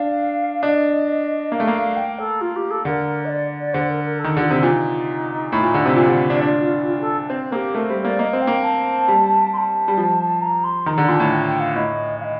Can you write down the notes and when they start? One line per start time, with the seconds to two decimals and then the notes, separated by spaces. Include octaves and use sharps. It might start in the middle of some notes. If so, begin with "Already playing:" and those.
Already playing: D4 F5
0.63 D4 D#5
1.52 A#3 F5
1.60 A3
1.67 A#3
1.96 G5
2.19 A4
2.41 F4
2.56 G4
2.71 A4
2.85 D3 A#4
3.25 D#5
3.29 D5
3.60 D5
3.74 D3 C5
3.89 A#4
4.04 A#4
4.19 A4
4.24 D#3
4.37 D3 F4
4.51 C3
4.63 A#2 D#4
5.52 A2
5.63 A#2
5.74 D3
5.85 C3
5.96 A#2 F4
6.08 D3
6.30 D4
6.41 D4 F4
6.63 F4
6.86 F4
7.01 A4
7.30 C4 C5
7.52 A#3 G4 A4
7.74 A3 A#4
7.90 G3 C5
8.04 A#3 D5
8.19 A#3 D#5
8.33 C4
8.41 G5
8.47 A#3
8.63 A5
9.08 G3
9.53 C6
9.58 A5
9.88 G3
9.98 F3
10.41 A#5
10.64 C6
10.86 D#3 A#5
10.98 D3
11.08 A#2 C6
11.12 A5
11.20 A2
11.31 G5
11.46 G5
11.60 F5
11.75 A2 D#5
12.20 F5
12.24 D#5